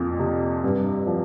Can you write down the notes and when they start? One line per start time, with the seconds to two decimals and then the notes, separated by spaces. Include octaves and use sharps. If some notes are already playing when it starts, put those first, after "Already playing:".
Already playing: F2 A#2 F3
0.19 C3
0.64 G2
1.07 F3